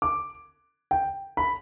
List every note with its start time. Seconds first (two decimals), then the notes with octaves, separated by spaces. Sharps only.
0.02 D6
0.91 G5
1.37 B5